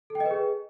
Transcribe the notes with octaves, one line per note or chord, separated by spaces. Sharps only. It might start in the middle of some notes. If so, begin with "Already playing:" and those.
A4
G5
D#5
B4
G#4